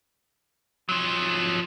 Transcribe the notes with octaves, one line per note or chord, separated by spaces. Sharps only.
F3 F#3